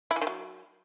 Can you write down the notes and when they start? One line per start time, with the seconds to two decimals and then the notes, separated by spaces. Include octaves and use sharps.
0.11 E4
0.16 E3
0.22 D#3
0.27 F#3